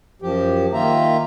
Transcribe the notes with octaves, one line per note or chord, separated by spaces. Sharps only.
F#2 F3 G4
D#3 A#3 F4 E5 A#5